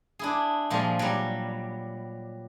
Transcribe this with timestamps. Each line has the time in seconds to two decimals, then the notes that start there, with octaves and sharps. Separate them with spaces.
0.19 D4 E4 G#4
0.70 A#2 F3 G3 G#3
0.99 F#3 G3